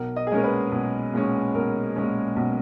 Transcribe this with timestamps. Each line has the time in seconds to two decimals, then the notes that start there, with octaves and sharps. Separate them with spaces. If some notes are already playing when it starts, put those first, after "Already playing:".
Already playing: B1 A#4
0.16 D#5
0.27 G#4
0.30 A#2 G#3 C#4 A#4
0.44 B4
0.71 B1
1.13 A#2 G#3 C#4
1.54 B1 A#4
1.96 A#2 G#3 C#4
2.36 B1